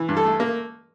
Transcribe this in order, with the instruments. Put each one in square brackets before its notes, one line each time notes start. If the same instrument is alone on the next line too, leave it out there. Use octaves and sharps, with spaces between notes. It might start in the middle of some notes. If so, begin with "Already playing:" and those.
Already playing: [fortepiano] E3
G2
A4
A3
A#3